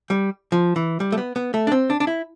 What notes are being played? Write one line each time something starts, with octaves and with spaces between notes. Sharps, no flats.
G3
F3
E3
G3
A3
B3
B3
A3
D4
C4
D4
D4
E4